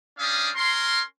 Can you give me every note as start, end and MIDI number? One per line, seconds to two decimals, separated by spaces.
0.18 0.50 55
0.18 0.50 61
0.18 0.50 62
0.18 0.50 77
0.18 0.50 87
0.55 1.00 61
0.55 1.00 70
0.55 1.00 84